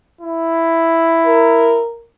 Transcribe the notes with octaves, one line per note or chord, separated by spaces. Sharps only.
E4
A#4